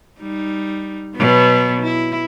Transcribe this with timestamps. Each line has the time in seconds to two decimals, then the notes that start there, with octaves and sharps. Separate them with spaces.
0.21 G3 D#4
1.16 B2 F#3 B3
1.81 E4